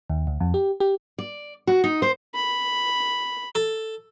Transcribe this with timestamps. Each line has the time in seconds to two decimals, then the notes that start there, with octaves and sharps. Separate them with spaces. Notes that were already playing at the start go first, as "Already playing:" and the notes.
0.10 D#2
0.27 D2
0.40 F2
0.54 G4
0.80 G4
1.18 D5
1.67 F#4
1.84 D#4
2.02 C5
2.35 B5
3.55 A4